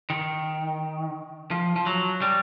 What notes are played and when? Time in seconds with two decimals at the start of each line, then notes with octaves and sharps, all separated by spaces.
0.10 D#3
1.51 F3
1.76 F3
1.86 F#3
2.22 G3